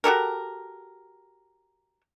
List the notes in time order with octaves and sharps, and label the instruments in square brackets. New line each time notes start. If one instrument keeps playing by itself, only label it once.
[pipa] F#4 G4 A4 A#4